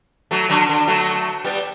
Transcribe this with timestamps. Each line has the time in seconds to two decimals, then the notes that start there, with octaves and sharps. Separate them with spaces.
0.31 F#3 A3
0.49 D3 F#3
0.69 D3
0.88 F#3 A3
1.44 G3 B3